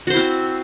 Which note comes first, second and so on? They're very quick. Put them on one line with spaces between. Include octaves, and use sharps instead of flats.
F#4 C5 E4 C4